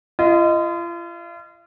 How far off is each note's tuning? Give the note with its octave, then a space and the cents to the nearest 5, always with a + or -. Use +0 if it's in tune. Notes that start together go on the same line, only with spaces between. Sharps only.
F4 -40 D#5 +0